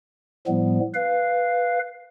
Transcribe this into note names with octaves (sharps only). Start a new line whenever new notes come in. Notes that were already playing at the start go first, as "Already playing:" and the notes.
A2 F3 G3 B3
B4 F5